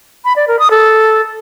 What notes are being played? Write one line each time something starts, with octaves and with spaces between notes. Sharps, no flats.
B5
D5
A#4
D#6
A4